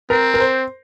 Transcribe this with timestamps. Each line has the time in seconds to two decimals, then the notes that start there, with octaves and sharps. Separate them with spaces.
0.10 C4 A#4
0.34 A#4
0.40 C5